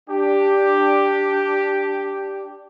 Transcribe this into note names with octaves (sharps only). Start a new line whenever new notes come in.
D4 G4